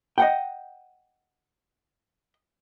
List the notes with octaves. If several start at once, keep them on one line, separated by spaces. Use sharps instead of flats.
D#5 F#5 G5